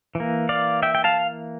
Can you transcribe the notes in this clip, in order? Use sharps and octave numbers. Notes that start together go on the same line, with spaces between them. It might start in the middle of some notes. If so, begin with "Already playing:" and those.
E3 A#3
D5 F5
E5 G5
G5
F5 A5